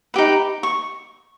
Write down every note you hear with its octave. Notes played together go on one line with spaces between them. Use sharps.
D#4 G4 B4
C#6